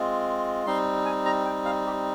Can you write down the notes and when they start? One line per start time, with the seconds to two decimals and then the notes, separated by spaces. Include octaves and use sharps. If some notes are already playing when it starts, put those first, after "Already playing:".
Already playing: G#3 C4 F4
0.66 G3 C4 D#4 C6
1.05 G#5
1.26 A#5
1.45 G5
1.65 F5
1.86 G4